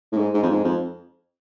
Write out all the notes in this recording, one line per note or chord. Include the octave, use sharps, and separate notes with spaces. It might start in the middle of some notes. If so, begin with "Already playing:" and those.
A2
G#2
G#2
F2
G#2
F2